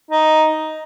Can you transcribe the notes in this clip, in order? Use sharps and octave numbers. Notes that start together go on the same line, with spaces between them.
D#4